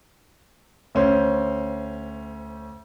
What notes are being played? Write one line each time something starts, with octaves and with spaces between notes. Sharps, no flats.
D2 C#4 C5